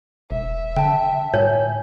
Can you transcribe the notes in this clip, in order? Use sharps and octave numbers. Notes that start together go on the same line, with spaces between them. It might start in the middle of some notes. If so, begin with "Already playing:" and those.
E1 E5
D3 G5 A5
A2 C#5 G#5 G6